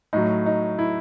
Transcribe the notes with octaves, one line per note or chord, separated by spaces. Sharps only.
A2 F#3 D#4
D#4
E4